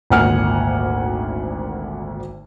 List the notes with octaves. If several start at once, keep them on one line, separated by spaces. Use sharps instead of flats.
G#1 D2 A#2 F#5 G#5 F6